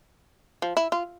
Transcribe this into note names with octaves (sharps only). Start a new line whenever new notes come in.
F3
E4
F4